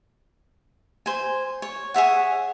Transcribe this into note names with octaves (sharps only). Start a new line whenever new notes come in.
C5 G#5
C#5
G#4 C#5 E5 F#5